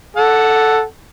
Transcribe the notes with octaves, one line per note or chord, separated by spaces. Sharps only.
A4 F#5